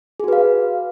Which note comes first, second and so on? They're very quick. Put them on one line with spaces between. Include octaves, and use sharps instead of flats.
G#4 F#4 B4 F5